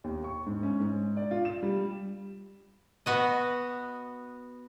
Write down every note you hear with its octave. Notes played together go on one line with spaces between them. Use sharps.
D#2
C#6
G#2
C#4
G#2
D5
F4
E7
G3
B3 F#4 D#5